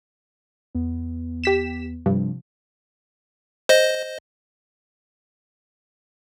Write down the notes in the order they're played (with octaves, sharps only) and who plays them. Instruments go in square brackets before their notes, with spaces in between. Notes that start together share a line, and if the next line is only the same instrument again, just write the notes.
[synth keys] E2 B3
[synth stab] G4 B6 E7
[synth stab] G2 [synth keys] C3 F3
[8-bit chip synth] C5 D#5